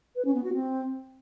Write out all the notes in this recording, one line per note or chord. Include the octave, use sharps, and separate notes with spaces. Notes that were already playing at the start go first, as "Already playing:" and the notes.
B4
C#4
B3
F#4
C4